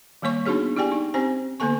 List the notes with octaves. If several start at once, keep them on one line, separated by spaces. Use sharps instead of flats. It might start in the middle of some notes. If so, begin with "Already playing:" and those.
D#3 G3 A#3 C#5 C#6
B3 D4 D#4 F#4 G#4 C#5
E4 G4 D5 G5 G#5
D#4
C4 C#4 G4 C5 G#5
D3 A#3 B3 A4 G#5 C#6